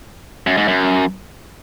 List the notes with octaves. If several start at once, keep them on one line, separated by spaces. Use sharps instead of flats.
F#2
G#2
F#2